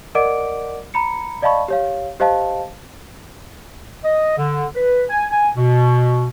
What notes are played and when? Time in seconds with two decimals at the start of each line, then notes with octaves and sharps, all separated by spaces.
0.15 A#4 D5 D#5 F#5 D6 D7
0.94 A#5 B5 C#7
1.42 D5 D#5 F5 A5 B5 C#6
1.68 G4 C#5 F5
2.20 G4 C5 D#5 F5 A5
4.03 D#5
4.37 D3
4.74 B4
5.10 G#5
5.31 G#5
5.55 B2